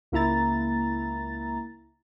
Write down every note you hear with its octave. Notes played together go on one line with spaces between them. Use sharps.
C#2 A#3 E4 A#5 A6